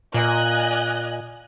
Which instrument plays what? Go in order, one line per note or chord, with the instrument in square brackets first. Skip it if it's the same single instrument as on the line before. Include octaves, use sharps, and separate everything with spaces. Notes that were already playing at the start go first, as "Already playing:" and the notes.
[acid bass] A#2 [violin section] D#5 G#5 F#6